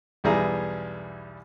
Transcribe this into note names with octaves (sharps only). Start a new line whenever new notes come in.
B1 E2 G3 E4 G#4 A#5